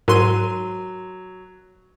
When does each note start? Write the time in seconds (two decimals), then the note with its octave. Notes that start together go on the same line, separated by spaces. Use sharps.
0.08 G#2 F#3 A#4 C6 D#7